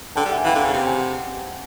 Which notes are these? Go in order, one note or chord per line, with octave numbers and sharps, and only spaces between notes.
D3 G5 A5
G3
E5 F#5
G#5
E3 F5 G5
D3
G#5
C#3
C3 G5
F#5 G#5